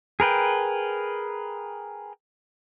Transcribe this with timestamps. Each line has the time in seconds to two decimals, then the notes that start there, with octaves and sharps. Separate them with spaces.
0.20 G#4 A#4 B4 G5